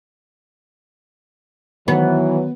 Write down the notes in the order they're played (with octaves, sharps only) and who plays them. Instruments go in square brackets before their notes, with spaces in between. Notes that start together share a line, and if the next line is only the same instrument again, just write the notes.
[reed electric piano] D#3 [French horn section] E3 [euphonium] F#3 [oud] B3